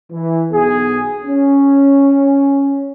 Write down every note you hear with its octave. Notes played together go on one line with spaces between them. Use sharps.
E3
B1 B3 G#4
C#4